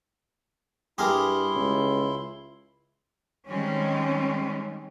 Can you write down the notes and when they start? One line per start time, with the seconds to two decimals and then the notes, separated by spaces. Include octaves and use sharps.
0.98 G2 E4 G4 G#4 A#4 C6
1.55 C#2
3.47 D#3 G3 G#3 C4 C#4